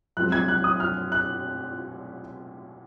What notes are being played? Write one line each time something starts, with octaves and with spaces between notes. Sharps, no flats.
F#2 F3 G#3 C4 F#6
G#6
F#6
D#6
F6
F#6